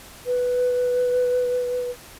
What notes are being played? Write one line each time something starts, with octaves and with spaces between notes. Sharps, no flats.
B4